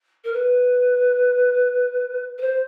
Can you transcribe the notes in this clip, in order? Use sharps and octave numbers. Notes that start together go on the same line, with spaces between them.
A#4
B4
B4
C5